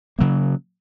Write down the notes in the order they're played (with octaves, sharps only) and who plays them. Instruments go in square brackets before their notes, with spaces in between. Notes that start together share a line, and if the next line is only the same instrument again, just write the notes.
[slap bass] C#3 F#3 A#3